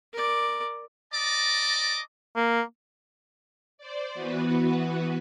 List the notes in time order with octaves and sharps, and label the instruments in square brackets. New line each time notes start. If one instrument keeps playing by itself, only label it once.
[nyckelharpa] A#4 D5
[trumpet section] D5 D#5 A5 A#5 D6
[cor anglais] A#3
[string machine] C5 D5
E3 B3 F#4 B4